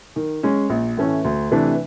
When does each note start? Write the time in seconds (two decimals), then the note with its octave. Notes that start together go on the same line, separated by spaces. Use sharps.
0.16 D#3
0.43 G#3 C#4
0.70 A#1
0.97 A2 E3 A3 C#4
1.24 D2
1.51 C3 E3 A3 D4